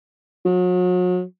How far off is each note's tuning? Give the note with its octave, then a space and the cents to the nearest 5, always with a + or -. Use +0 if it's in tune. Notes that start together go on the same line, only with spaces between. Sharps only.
F#3 -40